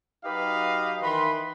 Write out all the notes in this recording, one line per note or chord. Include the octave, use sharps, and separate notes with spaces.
F#3 D#4 G4 B4 D#5 F5
D#3 E3 B4 B5 C6